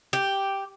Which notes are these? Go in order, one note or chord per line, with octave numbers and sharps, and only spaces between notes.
G4